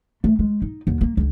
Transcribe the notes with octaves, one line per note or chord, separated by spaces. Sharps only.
A3
G#3
D#4
D#2 D3
A#3
C#2 D3